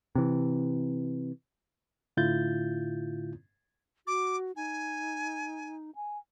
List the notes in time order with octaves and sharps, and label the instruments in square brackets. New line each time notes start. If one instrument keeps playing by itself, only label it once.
[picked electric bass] C3 E3
[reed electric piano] A2 D3 E4 F4 G6 A6
[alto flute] F#4 [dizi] D6
[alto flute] D#4 [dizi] G#5
[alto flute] G#5